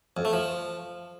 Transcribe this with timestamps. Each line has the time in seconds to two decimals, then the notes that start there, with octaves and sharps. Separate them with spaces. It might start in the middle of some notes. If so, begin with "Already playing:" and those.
0.17 F2
0.25 A3
0.33 F3